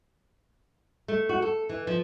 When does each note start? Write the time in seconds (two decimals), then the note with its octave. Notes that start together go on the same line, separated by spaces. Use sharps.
1.08 A3
1.29 F#4
1.42 A4
1.69 E3
1.87 F3